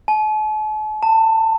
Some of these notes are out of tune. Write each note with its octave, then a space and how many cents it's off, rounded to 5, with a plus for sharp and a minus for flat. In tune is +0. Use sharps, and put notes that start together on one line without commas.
A5 -45
A5 +25